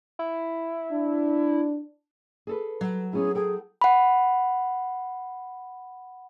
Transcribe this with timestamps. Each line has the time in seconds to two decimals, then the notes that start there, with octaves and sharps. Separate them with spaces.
0.19 E4
0.92 D4
2.47 G#4 A4 B4
2.81 F#3
3.13 B3 C#4 E4 G#4
3.35 G#4 A4 G5
3.81 F#5 B5